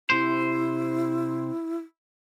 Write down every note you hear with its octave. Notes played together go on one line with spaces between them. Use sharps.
C3 E4 C5